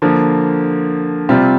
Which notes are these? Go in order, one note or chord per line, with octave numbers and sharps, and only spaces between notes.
D3 F3 A#3
C3 G3 C4 F4